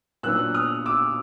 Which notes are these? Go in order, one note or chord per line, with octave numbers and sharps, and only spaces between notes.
A#2 F#3 B3 D4 E6 F#6
D#6 F6
D6 E6